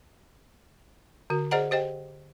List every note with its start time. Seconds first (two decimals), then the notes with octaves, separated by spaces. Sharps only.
1.30 D3 F#4
1.51 G#4 C5 D5 D#5 F#5 A#5
1.71 G4 C5 D#5 G5